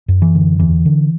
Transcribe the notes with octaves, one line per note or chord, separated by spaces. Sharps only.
F#2
E3
D3
E2 E3
D3